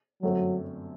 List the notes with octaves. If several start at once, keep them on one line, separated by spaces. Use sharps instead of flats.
G1 F#2 D3 F#3 A3 C4